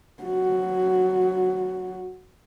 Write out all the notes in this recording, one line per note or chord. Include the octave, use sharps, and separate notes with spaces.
F#3 F#4